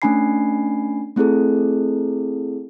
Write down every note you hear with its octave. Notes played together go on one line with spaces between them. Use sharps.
A3 C#4 D4 G#5 B5 C7
A3 C4 E4 G#4 A4